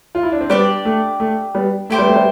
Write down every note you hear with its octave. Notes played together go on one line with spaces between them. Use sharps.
F4
E4
D4
C4
G3 B3 D4 G4 D5
A3
A3
G3 B3
A3 E4 G4 C5
G3 B3
A3 C4
G3 B3